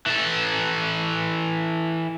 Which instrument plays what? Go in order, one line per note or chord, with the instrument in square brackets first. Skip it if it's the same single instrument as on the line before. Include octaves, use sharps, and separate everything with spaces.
[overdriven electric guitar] E3 A4